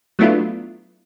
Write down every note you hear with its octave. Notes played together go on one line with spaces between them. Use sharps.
F#3 A3 B3 D4 E4 F4